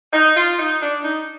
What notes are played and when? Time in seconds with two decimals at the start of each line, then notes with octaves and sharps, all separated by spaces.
0.13 D#4
0.37 F4
0.59 D#4
0.82 D4
1.04 D#4